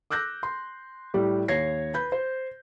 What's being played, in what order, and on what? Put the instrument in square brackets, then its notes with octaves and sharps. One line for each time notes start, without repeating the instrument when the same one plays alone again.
[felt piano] D6 E6 F#6 G6 A#6
C6
A2 G3 G4
D#2 C#5 G#6 A#6 C7
B4 B5 G6
C5